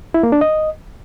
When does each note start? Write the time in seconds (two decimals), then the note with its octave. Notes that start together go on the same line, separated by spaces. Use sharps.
0.14 E4
0.23 A#3
0.32 D4
0.41 D#5